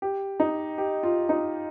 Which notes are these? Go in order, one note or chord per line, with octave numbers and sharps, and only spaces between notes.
G4
D#4
G4
F4
D#4